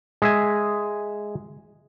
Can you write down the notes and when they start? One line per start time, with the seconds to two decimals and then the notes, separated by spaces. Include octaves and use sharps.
0.22 G#3 E5 G#5